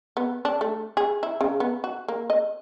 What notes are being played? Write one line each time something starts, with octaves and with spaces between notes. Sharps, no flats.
B3
D4
A3
G#4
E4
C#3
B3
F#4
A#3
D#5